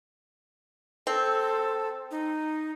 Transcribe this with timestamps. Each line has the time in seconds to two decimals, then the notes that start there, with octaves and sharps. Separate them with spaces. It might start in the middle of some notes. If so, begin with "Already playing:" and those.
1.07 C4 A4
2.11 D#4